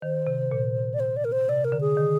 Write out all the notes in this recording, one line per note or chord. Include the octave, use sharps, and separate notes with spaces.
D#3 C5
C3
A#2
D5
C5
D5
A#4
C5
C3 D5
A#4
D3
G#4
D#3